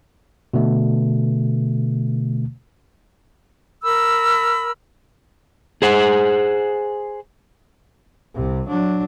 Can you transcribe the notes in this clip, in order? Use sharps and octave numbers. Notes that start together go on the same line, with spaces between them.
B2 D3 A3
A#4 B5 E6
G#4 C5 F#5
C2 C3
F#3 D4